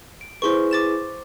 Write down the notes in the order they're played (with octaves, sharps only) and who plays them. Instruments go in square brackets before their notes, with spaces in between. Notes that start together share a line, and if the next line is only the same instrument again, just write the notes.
[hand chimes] D7
[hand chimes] E4 G#4 B4 [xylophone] C5 C6 C#6
[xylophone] D6 A6 E7